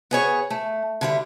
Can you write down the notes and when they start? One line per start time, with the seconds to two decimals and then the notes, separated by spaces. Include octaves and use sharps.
0.11 B3 G#4 C#5
0.50 A3
1.01 D3 G3 E4